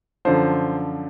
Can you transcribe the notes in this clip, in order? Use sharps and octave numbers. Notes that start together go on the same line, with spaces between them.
F#2 D3 F3 C5